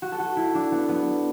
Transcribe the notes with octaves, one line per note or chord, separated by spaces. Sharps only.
F#4
A4
F#4
E4
D4
B3
B3